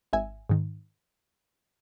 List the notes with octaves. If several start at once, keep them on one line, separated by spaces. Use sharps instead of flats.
G#1 E5 G#5
G#2 D#3